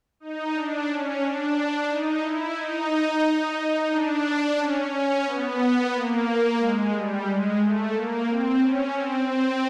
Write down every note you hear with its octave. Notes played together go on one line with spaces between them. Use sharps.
D#4
D4
C#4
D4
D#4
E4
D#4
D4
C#4
C#4
B3
A#3
G#3
G3
G#3
A3
A#3
C4
C#4
C4
C4